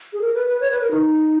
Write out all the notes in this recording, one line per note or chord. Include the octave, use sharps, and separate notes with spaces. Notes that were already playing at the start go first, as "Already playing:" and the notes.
G#4
A#4
B4
B4
C#5
B4
A#4
D#4